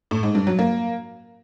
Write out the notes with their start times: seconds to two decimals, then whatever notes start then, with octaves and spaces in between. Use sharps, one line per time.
0.11 A2
0.23 G#2
0.35 G2
0.47 F#3
0.59 A#3